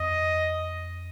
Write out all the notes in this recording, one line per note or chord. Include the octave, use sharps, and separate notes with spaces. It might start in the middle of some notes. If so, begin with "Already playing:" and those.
Already playing: F2 D#5